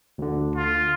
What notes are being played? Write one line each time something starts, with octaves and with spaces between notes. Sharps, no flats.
D2 D3
F4